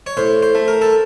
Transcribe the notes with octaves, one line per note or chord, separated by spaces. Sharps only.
C#5
A2 C5
C5
A3
A#4
A4